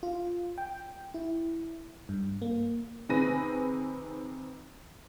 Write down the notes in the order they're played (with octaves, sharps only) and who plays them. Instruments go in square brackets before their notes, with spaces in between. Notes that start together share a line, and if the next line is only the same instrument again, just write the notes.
[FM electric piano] F4
G5
E4
G2
A#3
[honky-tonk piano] C3 D#3 G#4 B4 A#6 D#7